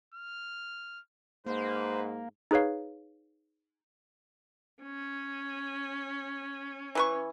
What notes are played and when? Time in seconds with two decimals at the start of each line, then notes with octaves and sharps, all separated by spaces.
0.14 F6
1.46 G#2 A#3 B4 C5
2.51 D#4 G#4 B4 C#5 F5
4.82 C#4
6.95 E3 B4 C#6